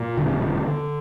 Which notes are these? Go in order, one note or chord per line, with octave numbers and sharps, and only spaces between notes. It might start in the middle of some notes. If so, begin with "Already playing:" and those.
Already playing: A#2
E1 D3
D3
D3